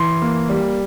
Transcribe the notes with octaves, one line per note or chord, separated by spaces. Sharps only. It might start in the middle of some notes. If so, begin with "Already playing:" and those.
Already playing: E3 C6
A#3
G3